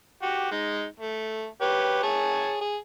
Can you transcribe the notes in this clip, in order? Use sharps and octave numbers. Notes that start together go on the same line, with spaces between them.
F#4 G4
G#3 D#4
A3
G4 B4 C#5
G#4 C#5 A5
G#4